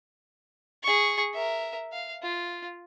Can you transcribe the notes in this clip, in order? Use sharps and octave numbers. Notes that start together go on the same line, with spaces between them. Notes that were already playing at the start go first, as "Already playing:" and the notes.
G#4 C#6
A#4 E5
F5
F4